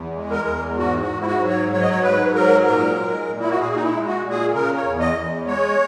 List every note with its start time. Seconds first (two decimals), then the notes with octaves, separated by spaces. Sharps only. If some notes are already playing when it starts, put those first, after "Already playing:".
Already playing: E2
0.16 G#3
0.31 A#4
0.48 E2
0.78 G#2 F#4
1.02 F#4
1.09 G#2
1.21 E4
1.26 F#4
1.40 F#3
1.48 C#5
1.72 F#3 C#5
1.81 D#5
1.90 C#5
2.03 G#2 B4
2.35 F#3 A#4
2.65 A#2 A#4
2.97 G#3
3.29 A#2
3.40 E4
3.50 F#4
3.59 A#2 G#4
3.75 D#4
3.82 E4
3.91 G#3
4.06 F#4
4.22 A#2
4.30 G#4
4.53 C#3 A#4
4.77 C#5
4.84 E2
5.00 D#5
5.16 E2
5.47 G#3 C#5